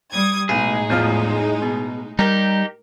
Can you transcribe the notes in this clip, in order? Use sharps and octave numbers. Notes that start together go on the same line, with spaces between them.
G3 D#6 G#6
B1 A2 G#3 D#4 G#4
E2 F3 F4
B2
G3 D#4 G4 A#4